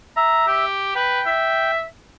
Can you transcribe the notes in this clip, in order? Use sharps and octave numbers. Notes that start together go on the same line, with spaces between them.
E5 A#5
G4
B4 G5
E5